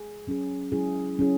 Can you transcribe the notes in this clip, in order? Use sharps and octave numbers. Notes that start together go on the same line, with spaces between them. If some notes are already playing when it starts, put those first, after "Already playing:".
Already playing: G#4
F#3 C#4 G#4
F#3 C#4 E4 G#4
F#3 C#4 E4 G#4